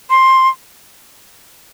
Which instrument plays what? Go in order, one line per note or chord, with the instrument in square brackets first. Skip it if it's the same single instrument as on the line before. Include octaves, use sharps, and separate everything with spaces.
[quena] C6